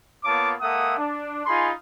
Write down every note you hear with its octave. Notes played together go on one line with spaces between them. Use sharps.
A#3 B3 F4 C#5 A5 D6
G#3 A#3 A4 E5 F#5 D#6
D4
D#4 F4 G#4 G#5 B5 C6